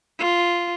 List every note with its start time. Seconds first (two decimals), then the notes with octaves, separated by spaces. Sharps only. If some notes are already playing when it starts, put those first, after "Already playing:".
0.19 F4